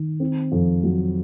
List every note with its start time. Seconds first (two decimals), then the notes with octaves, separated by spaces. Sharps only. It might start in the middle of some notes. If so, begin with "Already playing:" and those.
Already playing: D#3
0.20 C4
0.52 F2
0.83 F#3